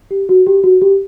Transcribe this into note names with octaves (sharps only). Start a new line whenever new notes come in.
G4
F#4
G4
F#4
G4